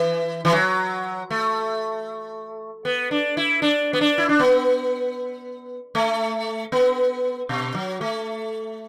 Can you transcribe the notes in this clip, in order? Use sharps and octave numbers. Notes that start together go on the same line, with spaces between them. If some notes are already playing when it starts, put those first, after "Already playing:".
Already playing: E3
E3
F#3
A3
B3
D4
E4
D4
B3
D4
E4
D4
B3
A3
B3
B2
F#3
A3